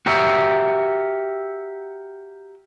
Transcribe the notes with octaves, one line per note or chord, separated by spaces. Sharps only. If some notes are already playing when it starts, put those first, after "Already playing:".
F#4 G4 A#4 C#5 E5